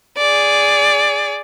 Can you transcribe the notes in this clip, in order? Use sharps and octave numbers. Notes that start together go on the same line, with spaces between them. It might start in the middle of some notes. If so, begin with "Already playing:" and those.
G#4 D5